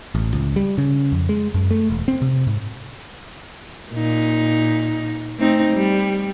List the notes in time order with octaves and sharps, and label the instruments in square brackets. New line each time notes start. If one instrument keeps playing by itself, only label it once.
[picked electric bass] A1
C#2
G3
C#3
F2
G#3
F#2
A3
E1
C4
C3
G#2
[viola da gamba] A#2 D#4
A3 C4 D#4
G3